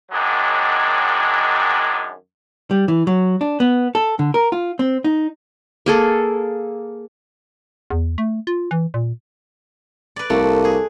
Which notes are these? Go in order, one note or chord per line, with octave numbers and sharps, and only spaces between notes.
F#2 D#3 F#3 G#3 D4
G3
E3
F#3
D4
B3
A4
D3
A#4
F4
C4
D#4
A#3 G#4 A4
E2
A3
F4
E3
A#2
B4 D5
C2 A3 A#3
G#4